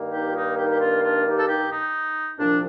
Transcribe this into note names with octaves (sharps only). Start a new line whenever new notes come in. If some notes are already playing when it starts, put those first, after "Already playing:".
Already playing: G2 D#3 A#3
D#4 G4
F4
D#4
D#4 G4
G4
D4 F4
D4 F4
D#4 G4
A4
D#4 G4
D#4
C2 A#2 F3 D4